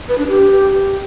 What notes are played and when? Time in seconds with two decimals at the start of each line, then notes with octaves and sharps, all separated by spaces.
0.09 B4
0.18 D4
0.28 G4